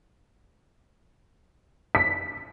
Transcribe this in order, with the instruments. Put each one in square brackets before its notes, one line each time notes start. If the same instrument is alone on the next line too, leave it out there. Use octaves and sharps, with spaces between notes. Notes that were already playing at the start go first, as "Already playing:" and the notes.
[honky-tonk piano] B6